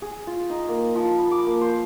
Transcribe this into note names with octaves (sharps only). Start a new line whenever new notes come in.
G#4
F4
D#4
A#3
F3
B5
D6
A#3
C5